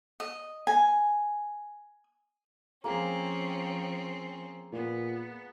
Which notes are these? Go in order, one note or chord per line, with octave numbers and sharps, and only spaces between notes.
D#5
G#5
F3 A#3 C4 C#4 G#4
A#2 B3